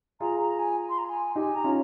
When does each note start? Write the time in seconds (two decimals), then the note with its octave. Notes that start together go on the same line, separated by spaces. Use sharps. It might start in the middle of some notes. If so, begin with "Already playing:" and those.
0.20 F4 G#4 A#5
0.40 A#5
0.59 G#5
0.89 C6
0.98 A#5
1.08 G#5
1.35 D#4 G4 G#5
1.55 A#5
1.64 C#4 F4